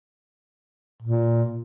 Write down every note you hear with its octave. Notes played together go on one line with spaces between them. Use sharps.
A#2